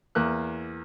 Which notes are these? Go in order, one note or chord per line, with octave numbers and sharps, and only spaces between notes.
E2 A#3 F#6